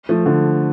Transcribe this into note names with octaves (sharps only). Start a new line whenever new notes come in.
F3 A3
D3 F3